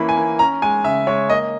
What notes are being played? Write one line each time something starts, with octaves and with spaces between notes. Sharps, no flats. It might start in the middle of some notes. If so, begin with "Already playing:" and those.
Already playing: E3 A#3 C#4 B5
G#5
A#3
C#4 A#5
G#3 G#5
C#3 E5
G#3 C#5
A#3 D#5